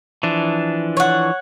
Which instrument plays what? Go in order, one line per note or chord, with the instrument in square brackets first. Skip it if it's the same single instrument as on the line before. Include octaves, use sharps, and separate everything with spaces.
[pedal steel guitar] E3 F3 D4
[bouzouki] C#5 F#5